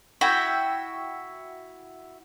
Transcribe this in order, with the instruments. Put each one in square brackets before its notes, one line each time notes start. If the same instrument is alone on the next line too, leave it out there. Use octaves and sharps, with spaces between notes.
[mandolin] E4 F#4 E5 G5